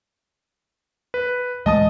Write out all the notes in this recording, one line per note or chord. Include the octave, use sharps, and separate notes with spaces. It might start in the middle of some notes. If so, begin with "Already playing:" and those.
B4
D1 E3 G#3 D#5 A5 D#6